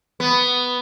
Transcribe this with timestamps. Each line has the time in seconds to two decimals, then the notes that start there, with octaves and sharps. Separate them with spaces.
0.20 B3